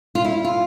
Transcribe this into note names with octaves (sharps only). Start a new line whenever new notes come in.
F4
E4
F4